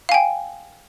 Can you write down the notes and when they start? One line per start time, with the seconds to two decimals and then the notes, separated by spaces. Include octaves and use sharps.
0.09 F5
0.12 G#5
0.14 G5